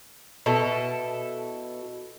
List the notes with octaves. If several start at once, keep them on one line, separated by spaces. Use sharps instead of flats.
B2 E4 A4